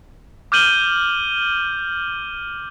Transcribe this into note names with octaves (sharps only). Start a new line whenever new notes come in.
D6 F6 G6 D#7 F#7 G7